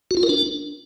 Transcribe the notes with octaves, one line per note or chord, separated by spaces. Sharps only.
F#4
F4
A#4
D4